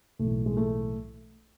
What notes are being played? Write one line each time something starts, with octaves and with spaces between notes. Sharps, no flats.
B1 A2 E3 A3
G#3
A3